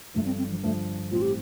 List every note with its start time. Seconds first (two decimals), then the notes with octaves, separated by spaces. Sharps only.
0.14 G1 G2 D3 F3 A3
0.26 C4
0.38 C4
0.51 F3
0.63 G1 G2 D3 F3 A3
1.11 A1 A2 G3 C4 F4
1.22 G4